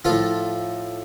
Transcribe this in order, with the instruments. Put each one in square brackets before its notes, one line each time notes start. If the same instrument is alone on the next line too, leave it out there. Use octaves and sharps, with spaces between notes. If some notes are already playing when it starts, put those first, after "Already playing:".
[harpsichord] A2 F3 F4 A4